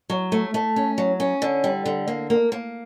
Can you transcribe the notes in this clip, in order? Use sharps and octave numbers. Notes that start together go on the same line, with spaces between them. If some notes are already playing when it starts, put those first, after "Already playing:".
F#3
A3
A3
C#4
F#3
C#4
D3
G3
D3
A#3
A#3
A#3